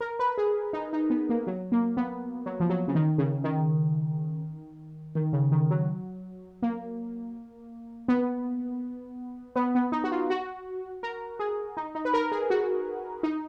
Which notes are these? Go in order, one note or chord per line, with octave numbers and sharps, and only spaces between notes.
A#4
B4
G#4
D#4
D#4
B3
A#3
F#3
A#3
B3
F#3
F3
F#3
C#3
D#3
C#3
D#3
D#3
C#3
D#3
F#3
A#3
B3
B3
B3
D#4
F#4
F4
F#4
A#4
G#4
D#4
D#4
B4
A#4
G#4
F#4
D#4